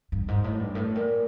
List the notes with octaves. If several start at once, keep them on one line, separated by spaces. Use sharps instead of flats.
G2
G#2
A2
G2
A2
A#2